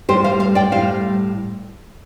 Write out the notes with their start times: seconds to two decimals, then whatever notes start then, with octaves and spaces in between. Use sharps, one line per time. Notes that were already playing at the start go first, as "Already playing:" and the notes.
0.09 A2 G3 G4 C5
0.24 C5 F5
0.40 C5 F5
0.55 D5 G5
0.72 A2 G3 C5 F5